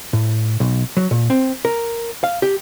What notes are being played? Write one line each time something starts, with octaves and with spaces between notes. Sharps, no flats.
A2
B1
F#3
A#2
C4
A#4
F5
G4